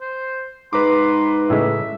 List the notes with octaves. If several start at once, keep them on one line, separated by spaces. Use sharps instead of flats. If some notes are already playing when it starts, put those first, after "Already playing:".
C5
G#2 B4 A#5 C6 D6
A2 C#3 G#3 E5